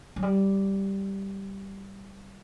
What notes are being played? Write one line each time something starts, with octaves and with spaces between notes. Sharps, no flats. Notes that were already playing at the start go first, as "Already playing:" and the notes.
F#3
G3